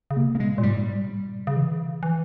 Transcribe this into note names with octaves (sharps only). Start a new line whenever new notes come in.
C#3
C3 A#3
A#3
A#2 G#3
A#2
G#2 G3
G3
A#2
C3
C#3
E3
E3